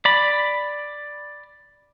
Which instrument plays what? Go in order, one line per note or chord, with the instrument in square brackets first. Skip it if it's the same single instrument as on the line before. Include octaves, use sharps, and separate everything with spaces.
[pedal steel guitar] D5 B5